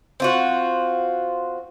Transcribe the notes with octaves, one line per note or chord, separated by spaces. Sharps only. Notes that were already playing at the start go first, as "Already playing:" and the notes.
C4 F4 F#4